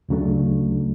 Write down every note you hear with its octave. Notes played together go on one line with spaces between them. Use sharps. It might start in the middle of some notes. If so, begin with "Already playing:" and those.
D2 C#3 F#3 A3 D4